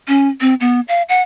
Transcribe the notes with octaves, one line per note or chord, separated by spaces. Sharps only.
C#4
C4
B3
F5
F#5